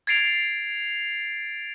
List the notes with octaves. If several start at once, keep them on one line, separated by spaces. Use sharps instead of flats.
G#6 A6 C7 D7 F7